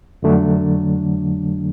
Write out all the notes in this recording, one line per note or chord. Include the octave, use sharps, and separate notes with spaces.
F2 D3 F#3 A3 D4